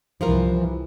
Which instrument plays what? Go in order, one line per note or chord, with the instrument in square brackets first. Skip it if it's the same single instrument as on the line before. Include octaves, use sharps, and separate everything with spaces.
[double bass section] C2 G2 E3 [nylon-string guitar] F3 F4 A#4